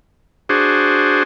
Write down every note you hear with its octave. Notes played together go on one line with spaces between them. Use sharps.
D4 F#4 G#4 C5